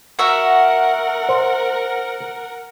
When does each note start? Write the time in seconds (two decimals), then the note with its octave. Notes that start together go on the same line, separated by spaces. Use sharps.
0.19 F#4 A#4 E5 F#5 A#5
1.29 C5